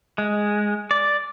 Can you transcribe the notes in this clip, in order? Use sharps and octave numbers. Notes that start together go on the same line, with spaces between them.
G#3
D5